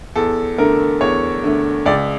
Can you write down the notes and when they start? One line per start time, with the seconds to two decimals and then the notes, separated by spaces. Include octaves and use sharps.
0.15 E2 A4
0.58 D3 A3 A#4
1.01 E2 C#5
1.44 D3 A3
1.86 C#2 D5